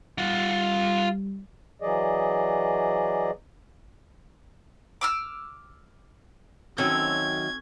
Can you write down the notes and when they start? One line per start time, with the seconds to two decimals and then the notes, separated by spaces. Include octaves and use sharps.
0.18 G3 F4 F#5
1.82 E3 F#3 G#4 D5 D#5
5.01 D6 E6 F6
6.78 F#2 D#3 F#3 C4 C#4 A4 G#6